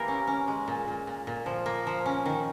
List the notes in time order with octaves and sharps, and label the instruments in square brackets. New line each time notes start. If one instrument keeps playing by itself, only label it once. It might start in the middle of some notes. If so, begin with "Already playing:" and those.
Already playing: [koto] E3 A#3 G4 A#4
C#4
C#4
G#3
A#2
A#2
A#2
A#2
F3
A#3
F3
C#4
D#3